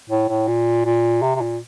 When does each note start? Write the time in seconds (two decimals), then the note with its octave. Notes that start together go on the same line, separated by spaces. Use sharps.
0.10 A2
0.29 A2
0.48 A#2
0.86 A#2
1.22 C3
1.36 C3
1.41 A#2